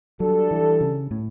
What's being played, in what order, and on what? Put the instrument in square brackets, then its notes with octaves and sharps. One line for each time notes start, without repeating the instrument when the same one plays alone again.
[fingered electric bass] F#3 [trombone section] G3 D4 A4
[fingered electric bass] E3
C#3
A2